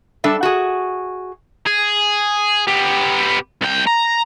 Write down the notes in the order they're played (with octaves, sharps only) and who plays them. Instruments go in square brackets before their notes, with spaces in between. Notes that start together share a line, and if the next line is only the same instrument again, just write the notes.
[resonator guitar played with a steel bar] G3 D4 A4 E5
F#4 G#4
[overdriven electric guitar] G#4
B3 G4
C2 G5
A#5